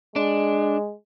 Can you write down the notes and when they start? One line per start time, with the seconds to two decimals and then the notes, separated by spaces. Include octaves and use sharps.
0.16 G#3 D4